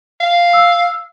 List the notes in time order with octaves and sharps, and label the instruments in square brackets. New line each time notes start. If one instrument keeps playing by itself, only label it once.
[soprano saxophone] F5
[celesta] E6